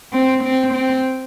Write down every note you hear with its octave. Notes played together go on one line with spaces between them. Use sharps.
C4
C4
C4